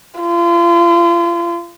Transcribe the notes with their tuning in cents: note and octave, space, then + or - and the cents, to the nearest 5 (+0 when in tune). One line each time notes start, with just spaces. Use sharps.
F4 -35